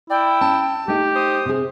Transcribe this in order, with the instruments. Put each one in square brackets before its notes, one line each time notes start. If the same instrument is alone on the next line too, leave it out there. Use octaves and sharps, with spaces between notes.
[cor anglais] E4 [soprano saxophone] D5 [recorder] G5
[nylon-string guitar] C#4 [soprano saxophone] A5
[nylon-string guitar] A3 D#4 [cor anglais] G4
[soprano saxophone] C5 [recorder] D#6
[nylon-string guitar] C3 G#4